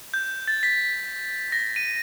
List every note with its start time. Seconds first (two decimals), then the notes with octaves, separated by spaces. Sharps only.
0.14 G6
0.48 A6
0.63 B6
1.52 A#6
1.76 D#7